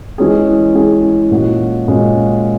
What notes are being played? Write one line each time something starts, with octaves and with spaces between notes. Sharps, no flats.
E3 G#3 C#4 G#4
E3 G#3 C#4 G#4
A#2 G#3 C#4 F#4
A#2 G#3 C#4 F#4